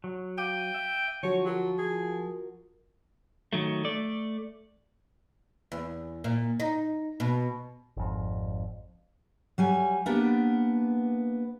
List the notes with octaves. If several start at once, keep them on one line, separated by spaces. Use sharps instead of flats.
F#3
F5 G5 D6 D#7
E5
D3 F3 F#3 F#4 C#5
F#3 F4 F#4 A#4
G#4
D#3 F#3 A3
A3 D5
E2
A#2
D#4
B2
G#1 F2
F#3 G3 G#5
A#3 B3 D4 G4